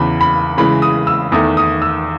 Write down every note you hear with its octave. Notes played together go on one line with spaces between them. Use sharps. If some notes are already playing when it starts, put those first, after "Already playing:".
Already playing: E2 C#3 E3 B5
B5
C#3 E3 G#3 B5
D#6
E6
E2 D#3 A3 D#6
D#6
E6